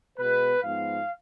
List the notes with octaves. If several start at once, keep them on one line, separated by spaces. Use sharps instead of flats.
B2 G#3 B3 B4
G#2 F3 B3 F5